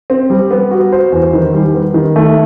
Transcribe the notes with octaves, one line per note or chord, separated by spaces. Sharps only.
C4
G3
B3
F#4
C5
E2
D#3
G3
B3
D#3
A3